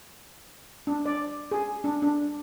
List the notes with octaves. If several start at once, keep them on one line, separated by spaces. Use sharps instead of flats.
D4
D5
G#4
D4
D4